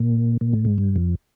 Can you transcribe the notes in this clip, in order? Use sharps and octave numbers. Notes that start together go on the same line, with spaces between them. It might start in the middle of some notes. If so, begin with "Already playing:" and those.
Already playing: A#2
A#2
A2
G#2
G2
F2